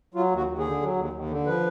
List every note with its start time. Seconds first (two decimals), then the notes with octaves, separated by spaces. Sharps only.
0.14 F#3 F4
0.31 D#2 F#4
0.48 D#2
0.59 G#4
0.65 D3
0.81 F#3
0.96 D#2
1.13 D#2
1.30 D3
1.46 F3 B4